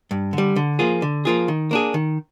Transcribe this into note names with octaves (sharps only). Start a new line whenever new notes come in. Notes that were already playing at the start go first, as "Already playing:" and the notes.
G2
D3
G3
D3
F3 A#3 F4 G#4
D3
F3 A#3 F4 G#4
D#3
A#3 D4 G#4
D#3